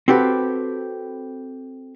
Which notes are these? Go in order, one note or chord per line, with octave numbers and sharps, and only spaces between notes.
C4 F#4 G4 A4 B4